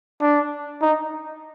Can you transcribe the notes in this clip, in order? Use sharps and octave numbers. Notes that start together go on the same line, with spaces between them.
D4
D#4